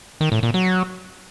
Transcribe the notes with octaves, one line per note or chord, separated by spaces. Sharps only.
D#3
A2
A#2
F#3